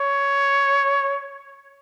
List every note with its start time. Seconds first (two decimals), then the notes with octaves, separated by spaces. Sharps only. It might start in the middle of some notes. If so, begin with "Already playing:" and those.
Already playing: C#5